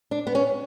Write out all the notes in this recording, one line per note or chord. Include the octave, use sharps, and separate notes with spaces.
D4
B3
C#4